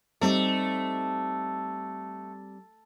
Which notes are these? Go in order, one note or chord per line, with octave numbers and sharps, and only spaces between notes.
G3 A3 C4 D#4